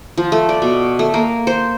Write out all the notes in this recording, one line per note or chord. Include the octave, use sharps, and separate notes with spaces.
F3
A3
D5
B2
A3
A#3
C5